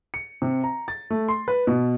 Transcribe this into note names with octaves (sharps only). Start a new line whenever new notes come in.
C#7
C3
A#5
A6
A3
C6
B4
B2